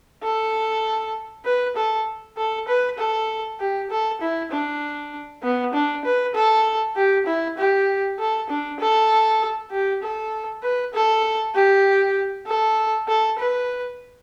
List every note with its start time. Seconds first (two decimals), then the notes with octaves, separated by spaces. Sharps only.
0.23 A4
1.45 B4
1.76 A4
2.37 A4
2.68 B4
2.98 A4
3.60 G4
3.90 A4
4.21 E4
4.51 D4
5.43 B3
5.74 D4
6.04 B4
6.34 A4
6.96 G4
7.26 E4
7.57 G4
8.19 A4
8.50 D4
8.80 A4
9.71 G4
10.02 A4
10.63 B4
10.94 A4
11.55 G4
12.47 A4
13.08 A4
13.39 B4